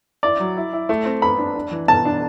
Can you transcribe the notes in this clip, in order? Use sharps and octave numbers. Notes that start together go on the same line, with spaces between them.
E4 D5
F#3
E4
E4
A3
C4
B3 B5
D4
D4
E3
B2 A5
D4